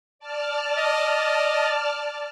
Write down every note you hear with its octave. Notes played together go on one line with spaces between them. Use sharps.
D5 A5 F6
D#5